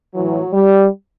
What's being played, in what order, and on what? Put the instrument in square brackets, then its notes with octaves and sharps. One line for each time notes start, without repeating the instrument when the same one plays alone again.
[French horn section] A2 E3 F#3
G3